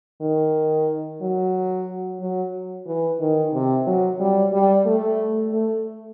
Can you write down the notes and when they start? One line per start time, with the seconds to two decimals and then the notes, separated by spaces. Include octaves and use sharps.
0.21 D#3
1.21 F#3
2.21 F#3
2.87 E3
3.20 D#3
3.53 C3
3.87 F#3
4.20 G3
4.53 G3
4.86 A3
5.52 A3